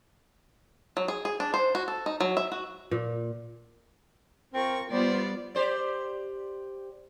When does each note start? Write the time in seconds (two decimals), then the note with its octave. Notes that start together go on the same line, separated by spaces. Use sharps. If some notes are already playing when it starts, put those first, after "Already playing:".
0.97 F#3
1.08 G#4
1.25 G#4
1.40 D4
1.54 C5
1.75 F#4
1.88 A4
2.06 D#4
2.20 F#3
2.37 E5
2.52 F#4
2.91 A#2
4.54 C4 F4 A#4 C#6
4.89 G3 B3 F4 C5 D5
5.55 G4 C5 D5